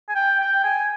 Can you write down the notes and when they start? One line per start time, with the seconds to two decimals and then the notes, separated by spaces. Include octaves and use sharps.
0.09 G#5
0.15 G5
0.40 G5
0.64 G#5